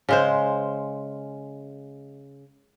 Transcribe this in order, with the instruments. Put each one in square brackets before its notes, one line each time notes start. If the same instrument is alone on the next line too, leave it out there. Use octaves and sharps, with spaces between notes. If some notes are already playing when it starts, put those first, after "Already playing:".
[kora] C#3 G#3 C5